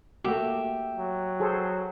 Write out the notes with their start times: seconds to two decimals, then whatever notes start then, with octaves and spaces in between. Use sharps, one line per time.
0.24 A3 A#3 F#4 G4 E5
0.97 F#3
1.40 G#4 A4 C5